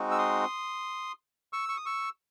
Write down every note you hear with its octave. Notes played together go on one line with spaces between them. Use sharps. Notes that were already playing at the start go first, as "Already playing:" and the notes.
Already playing: G#3 C4 D#4 F#4
E6
C6 D#6
C#6 E6
C#6
D#6
C#6 E6